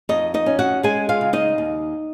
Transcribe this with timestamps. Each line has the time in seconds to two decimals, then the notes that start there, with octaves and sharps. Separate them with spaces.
0.09 F2 D#4 D#5
0.34 D#4 D#5
0.46 C#4
0.59 F#4 F#5
0.83 G#3 G#4 G#5
1.09 F4 F5
1.21 C#3
1.33 D#4 D#5
1.58 D#2